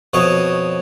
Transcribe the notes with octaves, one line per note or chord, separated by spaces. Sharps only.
F2 B2 C#5 D#5